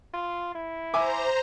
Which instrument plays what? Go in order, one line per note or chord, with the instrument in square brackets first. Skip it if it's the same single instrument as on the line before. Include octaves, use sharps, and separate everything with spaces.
[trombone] F4
E4
[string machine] C5 A#5 [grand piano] E5 G#5 D6